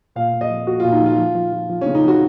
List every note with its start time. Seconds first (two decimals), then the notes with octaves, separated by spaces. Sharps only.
0.15 A#2 F5
0.32 A#2
0.41 D#5
0.50 F3
0.67 F3 F#4
0.80 F4
0.84 A#2
0.92 D#4
1.01 F3 F4
1.18 F3
1.34 F3
1.52 F3
1.69 F3
1.81 C#4
1.86 C#3
1.95 D#4
2.03 F3 F#4